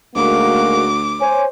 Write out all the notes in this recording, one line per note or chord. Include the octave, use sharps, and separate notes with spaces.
D2 G#2 G#3 A#3 F#4 D6
C5 C#5 G#5